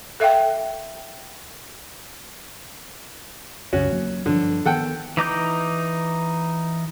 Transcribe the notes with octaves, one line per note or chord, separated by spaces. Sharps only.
A4 E5 F5 G5
C2 F#2 C#3 C#4 F#4
F#3 A#3
G2 D3 F3
D#3 B3 A4 F#5 G5
E3 D#4 D6 G6